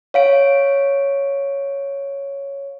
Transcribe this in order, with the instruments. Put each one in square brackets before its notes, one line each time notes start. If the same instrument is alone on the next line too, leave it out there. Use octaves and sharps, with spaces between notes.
[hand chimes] C#5 F5 D7